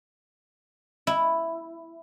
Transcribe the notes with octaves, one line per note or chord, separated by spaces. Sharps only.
E4